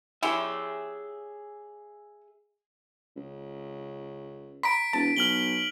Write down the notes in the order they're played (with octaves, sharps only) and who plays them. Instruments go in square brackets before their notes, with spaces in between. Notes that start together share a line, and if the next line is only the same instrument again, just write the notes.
[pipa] C#4 E4 G4 [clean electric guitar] G#4 E5
[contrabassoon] C#2
[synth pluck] A#5 B5 [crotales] B6 D7
[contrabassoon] E1 [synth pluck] A5
[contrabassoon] B1 [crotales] F6 F#7 G7